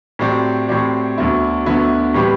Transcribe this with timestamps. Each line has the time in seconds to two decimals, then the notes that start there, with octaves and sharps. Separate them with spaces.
0.19 A2 F#3 C4 G4 D5
0.68 A2 F#3 C4 G4 D5
1.17 D2 D3 F#3 B3 E4
1.66 D2 D3 F#3 B3 E4
2.14 A2 G3 C4 G4 B4